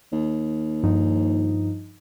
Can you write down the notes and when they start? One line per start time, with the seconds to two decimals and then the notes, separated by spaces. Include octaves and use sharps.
0.12 D#2
0.83 G2 F3 D#4